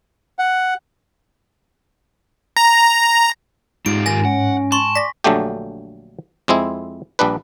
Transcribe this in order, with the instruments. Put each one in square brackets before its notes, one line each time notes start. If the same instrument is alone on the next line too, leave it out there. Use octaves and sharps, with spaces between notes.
[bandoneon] F#5
[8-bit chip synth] A#5
[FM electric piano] G#2 [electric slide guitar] D#4 F4 G4 [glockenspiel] D7
[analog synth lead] D#3 [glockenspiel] G#5 A#6
[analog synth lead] C#4 [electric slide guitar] F#5
[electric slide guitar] A5 [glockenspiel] C6 C#6
[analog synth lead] D5 [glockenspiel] A#6 B6
[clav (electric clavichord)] A#1 D3 F#3 A3 G4
F2 G#3 C4 E4
A#1 G3 D4 B4